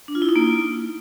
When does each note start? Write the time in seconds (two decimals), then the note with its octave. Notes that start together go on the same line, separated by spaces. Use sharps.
0.08 D4
0.15 F4
0.22 E4
0.29 D#4
0.36 A#3